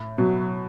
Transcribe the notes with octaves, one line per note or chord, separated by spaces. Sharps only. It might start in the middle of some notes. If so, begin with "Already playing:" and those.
Already playing: A2
B2 F#3